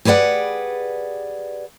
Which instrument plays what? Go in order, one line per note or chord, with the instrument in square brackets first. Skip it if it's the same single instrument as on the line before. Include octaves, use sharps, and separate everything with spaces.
[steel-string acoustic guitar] G4 G#4 B4 D5 F#5